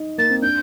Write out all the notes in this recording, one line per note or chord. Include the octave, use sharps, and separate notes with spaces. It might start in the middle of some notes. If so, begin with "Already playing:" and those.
Already playing: D#4
A#3 A6
C4
D4 G6